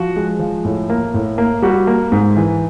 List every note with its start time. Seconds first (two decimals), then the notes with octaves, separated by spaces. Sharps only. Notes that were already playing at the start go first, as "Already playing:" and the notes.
Already playing: F3 F#4
0.16 G#3
0.39 F3
0.65 A2
0.90 A#3
1.14 A2
1.38 A#3
1.62 G3 F#4
1.87 A#3
2.12 G#2
2.36 E3